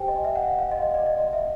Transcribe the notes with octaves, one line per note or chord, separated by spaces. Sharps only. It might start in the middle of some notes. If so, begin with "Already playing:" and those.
Already playing: G4 C5 G5 G#5
D#5
E5
F#5
F5
F5
D#5
D#5
D5
D#5
D#5
E5